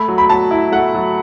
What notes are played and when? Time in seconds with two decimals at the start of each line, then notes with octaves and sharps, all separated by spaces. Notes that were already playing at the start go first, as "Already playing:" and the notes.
Already playing: A3 B5
0.08 F#3
0.18 B5
0.29 F#3 A5
0.51 E4
0.72 A3 F#5
0.94 F#3